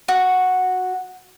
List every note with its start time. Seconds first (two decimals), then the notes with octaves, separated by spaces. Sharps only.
0.08 F#4